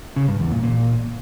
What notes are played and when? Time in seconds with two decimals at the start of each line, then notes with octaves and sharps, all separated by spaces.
0.16 C#3
0.28 G2
0.40 E2
0.52 A#2
0.64 A#2